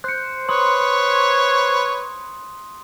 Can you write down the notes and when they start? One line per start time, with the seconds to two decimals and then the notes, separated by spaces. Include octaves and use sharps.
0.04 C5 F#6 C#7
0.49 B4 C#5 C6 D#6